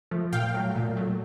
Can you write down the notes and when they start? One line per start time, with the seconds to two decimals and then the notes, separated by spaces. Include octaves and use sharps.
0.11 F3 A3
0.33 A#2 F5 G5
0.54 F#3 A3
0.76 A#2
0.97 F#3 A3